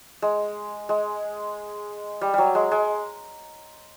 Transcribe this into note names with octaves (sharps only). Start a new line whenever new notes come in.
G#3
G#3
G3
F#3 G3
G#3
G#3